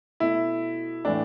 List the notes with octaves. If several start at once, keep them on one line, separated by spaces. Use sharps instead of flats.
B2 A3 E4
A2 E3 A3 D4